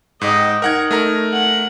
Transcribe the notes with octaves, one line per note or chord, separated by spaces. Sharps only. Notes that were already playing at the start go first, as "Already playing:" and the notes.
G#2 D#5 G5
D#4 A#4 F#5 G#6
A3 A#4 A#5
F#5